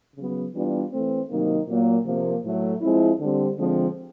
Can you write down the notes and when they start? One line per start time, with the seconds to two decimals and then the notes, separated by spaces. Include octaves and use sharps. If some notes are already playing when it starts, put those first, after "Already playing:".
0.15 C#3 F#3 B3
0.54 E3 G3 B3 D4 F4
0.91 E3 A3 C4
1.30 C3 D#3 F#3 A#3 D#4
1.68 A#2 F#3 A#3
2.06 C3 F3 A#3
2.44 A2 F#3 A3
2.82 F3 G#3 C4 E4
3.20 D3 G3 C4
3.58 D3 F3 G#3 C4